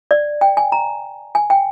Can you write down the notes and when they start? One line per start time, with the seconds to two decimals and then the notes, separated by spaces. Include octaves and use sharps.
0.11 D5
0.41 G5
0.57 G#5
0.72 A#5
1.35 G#5
1.50 G5